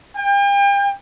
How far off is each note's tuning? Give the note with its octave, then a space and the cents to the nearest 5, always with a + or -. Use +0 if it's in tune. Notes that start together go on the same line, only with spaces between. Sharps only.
G5 +40